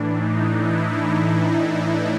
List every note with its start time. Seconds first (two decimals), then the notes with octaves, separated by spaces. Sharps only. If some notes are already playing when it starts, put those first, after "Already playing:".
Already playing: A2 E3 D4
0.14 D#4
0.54 E4